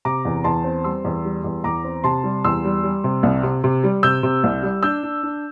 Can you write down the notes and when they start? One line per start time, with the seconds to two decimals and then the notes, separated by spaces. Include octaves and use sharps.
0.05 C3 A#5 D6
0.25 E2
0.44 E2 A5 C6
0.64 C4
0.84 G3 C6 E6
1.04 E2
1.25 G3
1.44 E2
1.64 E2 A#5 D6
1.84 C4
2.04 C3 A5 C6
2.24 G3
2.44 E2 C6 E6
2.65 G3
2.83 G3
3.04 C3
3.23 C2
3.43 C3
3.64 C3
3.84 G3
4.03 C3 E6 G6
4.23 C3
4.44 C2
4.63 G3
4.83 D4 E6 G6
5.03 D4
5.23 D4